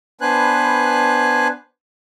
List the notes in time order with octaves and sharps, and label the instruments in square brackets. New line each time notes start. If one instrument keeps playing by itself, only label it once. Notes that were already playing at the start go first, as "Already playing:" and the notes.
[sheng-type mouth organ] B3 D4 B4 C5 G#5 F#6